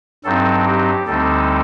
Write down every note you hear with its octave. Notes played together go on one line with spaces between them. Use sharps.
G2 F#3 C4 D#4 A4
G4
D2 D3 G3 C4 D#4 A4